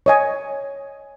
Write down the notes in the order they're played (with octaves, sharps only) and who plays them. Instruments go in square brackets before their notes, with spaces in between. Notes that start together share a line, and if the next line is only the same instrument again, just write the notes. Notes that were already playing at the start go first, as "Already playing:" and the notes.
[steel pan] C#5 D#5 G#5